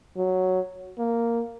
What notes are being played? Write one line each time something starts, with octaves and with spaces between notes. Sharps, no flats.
F#3
A#3